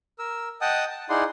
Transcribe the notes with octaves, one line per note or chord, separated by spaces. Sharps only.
A#4 E6
D#5 F#5 G5 A5 D#6
A5
D#4 E4 G#4 D5 F#5 C6